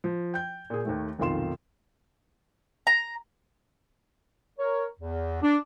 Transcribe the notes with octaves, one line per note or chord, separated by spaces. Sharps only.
F3
G5 G6
A#2 G#4
D#2 D#3 A3
F1 B1 D#3 F4 C6 E7
A#5
A#4 C#5
E2
D4